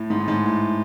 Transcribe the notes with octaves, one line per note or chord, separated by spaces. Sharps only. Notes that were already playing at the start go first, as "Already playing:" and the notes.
Already playing: A2
G#2
A2
G#2
A2